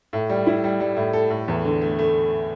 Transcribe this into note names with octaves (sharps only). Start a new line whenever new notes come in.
A2
G3
E4
G3
G3
A2
A4
A2
E2
D3
A3
A3